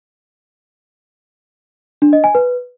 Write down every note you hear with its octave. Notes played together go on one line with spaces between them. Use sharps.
D4
D#5
G#5
B4